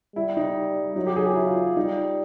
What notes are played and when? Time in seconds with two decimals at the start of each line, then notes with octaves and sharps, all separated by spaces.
0.16 G3 E4
0.37 D#4
0.96 F#3 D#4
1.07 G4
1.16 G#4
1.26 G4
1.36 E4
1.46 F4
1.57 F4
1.77 G3 D#4